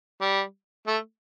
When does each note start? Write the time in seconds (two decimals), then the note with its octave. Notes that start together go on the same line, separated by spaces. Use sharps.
0.21 G3
0.87 A3